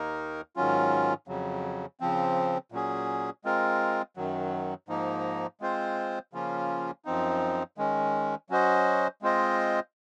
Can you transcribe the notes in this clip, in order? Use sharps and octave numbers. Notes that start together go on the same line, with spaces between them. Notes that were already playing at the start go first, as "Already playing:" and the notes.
Already playing: D#2 D#3 A#3 D#4 A#4
G#2 D#3 F#3 C#4 F4
F2 C#3 F#3
C#3 F3 C4
A#2 F#3 C#4 G#4
G#3 C4 F4 A#4
F#2 D#3 F#3
G#2 F3 A#3 D#4
G#3 C4 F4 C5
C#3 F3 A#3 C#4 F4
F#2 F3 C4 D#4
D#3 G#3 C#4
F#3 C#4 F#4 C5 D#5
G#3 C4 F4 C5 D#5